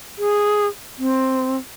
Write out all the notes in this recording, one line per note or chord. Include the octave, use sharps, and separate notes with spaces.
G#4
C4